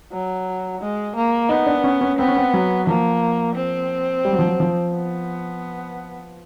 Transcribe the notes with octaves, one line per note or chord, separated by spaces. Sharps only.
F#3
G#3
A#3
B3 D#4
D4
C#4
C#4
B3 C4
C#4
C4
F#3
F3 A#3
C4
G3
F#3
F3
F#3
F3
B3